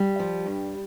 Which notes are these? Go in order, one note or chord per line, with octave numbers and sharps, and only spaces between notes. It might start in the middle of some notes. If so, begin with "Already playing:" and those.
Already playing: G3
F3
G2